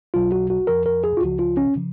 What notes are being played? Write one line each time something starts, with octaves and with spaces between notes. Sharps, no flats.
B1 B2 F#3 F4
F#4
F#4
F2 F3 A#4
A#4
G#4
F4
C#2 C#3 F3 F#4
F4
C#4
C#3 F3